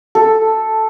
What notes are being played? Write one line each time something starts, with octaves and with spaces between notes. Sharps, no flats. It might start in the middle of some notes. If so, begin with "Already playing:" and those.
A4